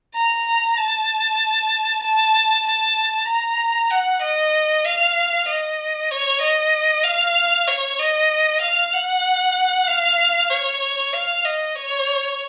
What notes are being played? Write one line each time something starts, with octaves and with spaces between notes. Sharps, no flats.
A#5
A5
A5
A5
A#5
F#5
D#5
F5
D#5
C#5
D#5
F5
C#5
D#5
F5
F#5
F5
C#5
F5
D#5
C#5